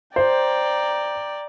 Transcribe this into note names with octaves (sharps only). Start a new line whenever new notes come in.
C5 D5 G5 A#5